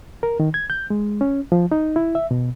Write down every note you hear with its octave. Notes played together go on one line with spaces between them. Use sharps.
A#4
D#3
G#6
G6
G#3
C#4
F3
D#4
E4
E5
B2